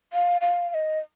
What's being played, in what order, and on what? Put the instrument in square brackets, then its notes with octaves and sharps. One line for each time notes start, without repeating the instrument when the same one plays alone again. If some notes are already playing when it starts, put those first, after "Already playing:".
[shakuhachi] F5
F5
F5
D#5